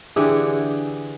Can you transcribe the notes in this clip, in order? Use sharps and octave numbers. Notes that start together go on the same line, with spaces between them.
D3 E3 G4 G#4